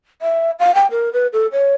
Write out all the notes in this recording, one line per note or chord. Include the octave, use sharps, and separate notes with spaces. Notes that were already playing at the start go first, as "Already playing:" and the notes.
E5
F5
G5
A#4
B4
A4
C#5